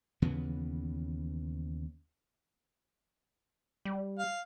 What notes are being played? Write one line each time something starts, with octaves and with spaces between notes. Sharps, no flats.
D#2 C#3 E3 B3
G3
F5